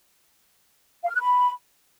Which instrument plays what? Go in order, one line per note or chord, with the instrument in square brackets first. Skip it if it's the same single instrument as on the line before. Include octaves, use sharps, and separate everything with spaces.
[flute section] F5
F6
F#6
B5